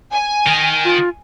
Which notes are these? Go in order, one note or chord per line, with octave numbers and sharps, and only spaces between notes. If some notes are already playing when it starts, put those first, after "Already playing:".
G#5
D#3
F4